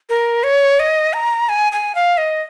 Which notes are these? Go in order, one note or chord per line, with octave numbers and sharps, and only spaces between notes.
A#4
C#5
D#5
A#5
G#5
G#5
F5
D#5